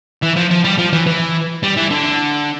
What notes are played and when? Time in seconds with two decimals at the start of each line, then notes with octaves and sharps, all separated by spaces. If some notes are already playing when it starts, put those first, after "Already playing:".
0.23 E3
0.36 F3
0.51 F3
0.64 G3
0.78 F3
0.93 E3
1.07 E3
1.63 G3
1.77 E3
1.90 D3